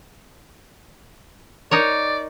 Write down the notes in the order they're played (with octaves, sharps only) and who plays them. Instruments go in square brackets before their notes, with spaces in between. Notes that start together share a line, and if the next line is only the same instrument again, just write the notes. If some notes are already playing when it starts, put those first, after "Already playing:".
[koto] D#4 A#4 C#5 [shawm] D5